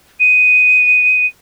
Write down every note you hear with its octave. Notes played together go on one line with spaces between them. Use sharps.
D#7